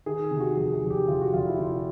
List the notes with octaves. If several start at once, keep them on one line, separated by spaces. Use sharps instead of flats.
D#3 G#4
C3
F#4
F1 G#4
G#4
F1
G4
F1 F4
F#4
F1 F4
E4
C3 F4